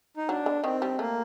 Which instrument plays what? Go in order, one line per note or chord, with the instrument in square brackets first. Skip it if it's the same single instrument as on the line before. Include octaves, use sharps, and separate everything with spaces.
[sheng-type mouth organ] D#4
[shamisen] F#3 [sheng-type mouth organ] D4
[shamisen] D3
[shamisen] D#3 [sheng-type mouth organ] C4
[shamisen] G3
[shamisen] A3 [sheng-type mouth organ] A#3